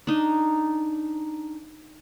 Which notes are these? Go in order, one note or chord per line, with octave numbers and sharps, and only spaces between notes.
D4 D#4